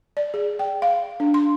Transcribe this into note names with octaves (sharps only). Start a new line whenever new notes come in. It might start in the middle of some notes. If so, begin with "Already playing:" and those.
D5
G#4
G5
F5
D4
C6